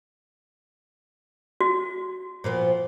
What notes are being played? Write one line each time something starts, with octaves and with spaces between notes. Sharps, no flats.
F#4
A#2 F3 B3